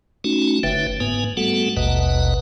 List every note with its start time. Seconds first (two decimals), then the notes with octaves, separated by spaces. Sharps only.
0.24 A3 C#4 D#4 F#4
0.63 F#1 D3 B4 E5 G5
1.00 G#2 A#3 B3 B4 G#5
1.37 G3 A3 B3 F#4 A4 F#5
1.77 A1 D#2 B2 B4 D#5 F#5